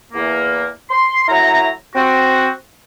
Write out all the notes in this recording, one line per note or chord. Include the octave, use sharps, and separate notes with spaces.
E2 A#3
C6
F#3 A3 E4 F#4 A#5
C4 F#4